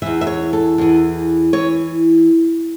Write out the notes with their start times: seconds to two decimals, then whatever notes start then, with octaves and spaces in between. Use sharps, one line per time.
0.02 E2 E3 E5
0.21 E5
0.27 C#5
0.53 A4
0.78 E2 E3
1.53 E3 C#5